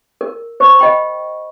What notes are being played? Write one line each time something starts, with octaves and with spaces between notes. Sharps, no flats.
A#4
C5 C#6
D#5 G5 B5